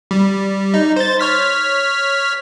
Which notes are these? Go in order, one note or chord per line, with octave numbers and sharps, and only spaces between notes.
G3
D#4
C5 A6
C#5 F6 B6